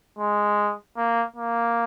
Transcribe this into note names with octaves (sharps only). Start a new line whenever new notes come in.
G#3
A#3
A#3